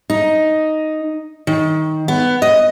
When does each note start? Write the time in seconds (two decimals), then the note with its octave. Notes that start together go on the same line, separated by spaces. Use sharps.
0.10 D#4
1.47 D#3
2.08 B3
2.42 D#5